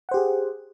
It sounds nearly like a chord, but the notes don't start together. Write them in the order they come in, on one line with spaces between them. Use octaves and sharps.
F#5 C5 G4 G#4